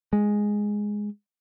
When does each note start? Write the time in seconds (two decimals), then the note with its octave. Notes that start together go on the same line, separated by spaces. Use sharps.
0.13 G#3